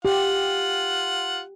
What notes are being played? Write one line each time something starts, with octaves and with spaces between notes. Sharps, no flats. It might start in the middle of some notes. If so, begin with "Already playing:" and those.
F4 G4 F#5